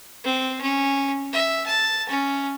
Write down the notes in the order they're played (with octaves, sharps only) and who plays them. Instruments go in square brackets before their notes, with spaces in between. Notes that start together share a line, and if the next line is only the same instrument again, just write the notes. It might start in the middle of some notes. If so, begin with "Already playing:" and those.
[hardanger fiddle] C4
C#4
E5
A5
C#4